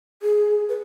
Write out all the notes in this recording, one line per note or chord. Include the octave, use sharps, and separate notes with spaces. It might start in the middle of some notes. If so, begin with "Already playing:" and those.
G#4
B4